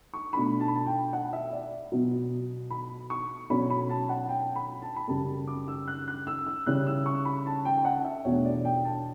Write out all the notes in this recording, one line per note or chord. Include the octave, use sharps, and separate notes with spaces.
C#6
B2 A3 D4 B5
A5
B5
A5
G5
F#5
E5
D5
B2 F#3 B3
B5
C#6
B2 F#3 C#4 B5
B5
A5
F#5
G5
B5
A5
B5
F#2 C#3 G3 A5
D6
E6
F#6
F#6
E6
E6
C#3 G3 C#4 E4 F#6
E6
C#6
B5
A5
G5
G5
F#5
E5
E2 B2 A3 D4 C#5
D5
G5
A5